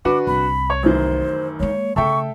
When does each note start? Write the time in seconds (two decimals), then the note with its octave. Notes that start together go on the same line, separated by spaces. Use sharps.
0.05 D3 D4 F#4 B4 D6
0.27 C2 B5
0.70 C#5
0.83 A1 F#2 D#3 C5
1.60 G#3 A#3 C#5
1.96 C#3 A3 A4 E5 G5 C#6